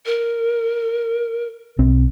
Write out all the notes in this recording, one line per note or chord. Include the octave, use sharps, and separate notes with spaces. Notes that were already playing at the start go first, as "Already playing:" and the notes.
A#4
B1 C4